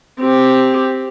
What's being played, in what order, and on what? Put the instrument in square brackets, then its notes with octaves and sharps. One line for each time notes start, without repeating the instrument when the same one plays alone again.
[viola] C4 G4